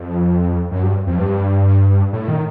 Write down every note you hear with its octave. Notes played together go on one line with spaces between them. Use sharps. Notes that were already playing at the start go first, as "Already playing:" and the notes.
Already playing: F2
F#2
G2
F2
G2
A2
D#3